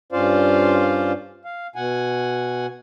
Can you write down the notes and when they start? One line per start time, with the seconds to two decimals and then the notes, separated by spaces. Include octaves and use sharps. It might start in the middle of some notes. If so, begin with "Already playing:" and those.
0.12 G2 C#4 F4 C5 D5 F5
1.45 F5
1.76 B2 F#5 G#5